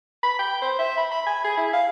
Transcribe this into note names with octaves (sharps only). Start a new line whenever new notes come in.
B5
G5
C5
E5
B5
B5
G#5
G#4
E4
F5